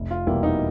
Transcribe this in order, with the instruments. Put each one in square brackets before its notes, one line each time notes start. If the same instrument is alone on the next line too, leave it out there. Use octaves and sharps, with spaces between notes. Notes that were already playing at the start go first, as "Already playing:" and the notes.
Already playing: [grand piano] F1
[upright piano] F4
[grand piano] E2 B2 G3 A#3 [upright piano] E4
[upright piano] D#4